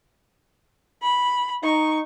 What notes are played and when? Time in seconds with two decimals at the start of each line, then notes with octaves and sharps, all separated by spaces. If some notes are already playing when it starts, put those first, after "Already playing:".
1.02 B5
1.64 D#4 C#6